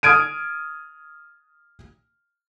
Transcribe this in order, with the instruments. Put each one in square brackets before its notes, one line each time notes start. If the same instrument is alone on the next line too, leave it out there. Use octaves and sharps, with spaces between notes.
[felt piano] D#6 F6 G#6 D7 D#7